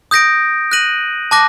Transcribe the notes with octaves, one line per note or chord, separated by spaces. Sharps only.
D#6 G6 A#6 D7
F#6 A#6 D#7 F#7
A5 D6 F#6 A#6